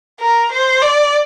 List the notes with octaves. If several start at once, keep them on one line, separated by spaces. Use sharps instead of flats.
A#4
C5
D5